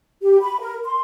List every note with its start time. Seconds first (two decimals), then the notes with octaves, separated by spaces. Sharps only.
0.22 G4
0.41 B5
0.60 A#4
0.85 C6